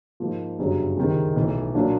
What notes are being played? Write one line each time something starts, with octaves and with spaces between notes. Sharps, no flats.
G#2 F3 A#3
G1 F#2 C#3 F#3
C#2 C3 D#3 G#3 C4
B1 A2 E3
A#2 F#3 A#3 D4 F4